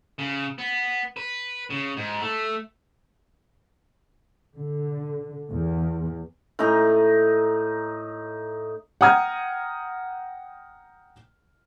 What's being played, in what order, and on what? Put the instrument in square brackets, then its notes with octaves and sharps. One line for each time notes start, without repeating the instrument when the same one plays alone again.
[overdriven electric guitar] C#3
B3
B4
C#3
G#2
A3
[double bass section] D3
E2
[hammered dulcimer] A2 D#4 A#5
[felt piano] F#5 G5 A#5 D#6 F6 G#6